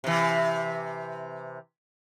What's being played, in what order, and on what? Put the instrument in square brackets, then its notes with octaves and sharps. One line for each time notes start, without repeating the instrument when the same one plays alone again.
[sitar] C3 E3